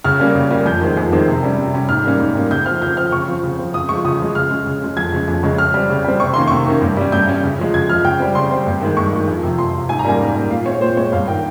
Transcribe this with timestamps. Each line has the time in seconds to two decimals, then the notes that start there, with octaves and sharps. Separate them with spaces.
0.04 C#3 F6
0.20 G3 A#3 C#4
0.35 C#3
0.51 G3 A#3 C#4
0.66 F2 G6
0.81 D#3 G#3 C4
0.97 F2
1.12 D#3 G#3 C4
1.28 C3
1.43 G3 C#4
1.58 C3
1.74 G3 C#4
1.89 G#2 F6
2.04 G3 A#3 C#4
2.20 G#2
2.35 G3 A#3 C#4
2.51 C#3 G6
2.66 F3 C4 F6
2.81 C#3 G6
2.97 F3 C4 F6
3.12 C#3 C#6
3.28 F3 C4
3.43 C#3
3.59 F3 C4
3.74 C#3 D#6
3.89 F3 G#3 C#6
4.05 C#3 D#6
4.20 F3 G#3
4.35 C#3 F6
4.51 G#3 C#4
4.66 C#3
4.82 G#3 C#4
4.97 F2 G#6
5.12 C#3 G#3 C#4
5.28 F2
5.43 C#3 G#3 C#4
5.58 C#3 F6
5.74 G3 C4
5.90 C#3
6.04 G3 C4
6.20 C3 C#6
6.34 D#3 A#3 C#4 C6
6.48 C3 C#6
6.66 D#3 A#3 C#4
6.82 G2
6.97 G3 C#4
7.12 G2 G6
7.27 G3 C#4
7.43 C#3
7.59 F3 G#3
7.74 C#3 G#6
7.90 F3 G#3 F6
8.04 C#3 G5
8.20 G3 C4
8.35 C#3 C6
8.51 G3 C4
8.66 G2
8.82 D#3 G#3
8.97 G2 C#6
9.13 D#3 G#3
9.28 F2
9.43 C3 F3
9.58 F2 C6
9.74 C3 F3
9.89 G#2 G#5
9.99 A#5
10.05 G3 A#3 C#4 G#5
10.20 G#2
10.36 G3 A#3 C#4
10.51 A#2 F5
10.66 G#3 C4 C#5
10.81 A#2 C5
10.97 G#3 C4 C#5
11.12 G2 F5
11.28 D#3 A#3 G5